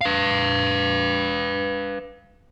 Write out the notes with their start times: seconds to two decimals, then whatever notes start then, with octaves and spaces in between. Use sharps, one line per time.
0.01 B4 F5